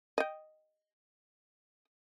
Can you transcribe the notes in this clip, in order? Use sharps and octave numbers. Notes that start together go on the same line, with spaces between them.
D#5 G5